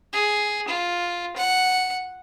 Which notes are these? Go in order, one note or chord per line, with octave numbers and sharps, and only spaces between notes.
G#4
F4
F#5